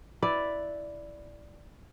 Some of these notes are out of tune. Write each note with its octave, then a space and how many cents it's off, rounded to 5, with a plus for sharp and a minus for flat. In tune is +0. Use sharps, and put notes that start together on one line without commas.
E4 +0 B4 +0 D5 +0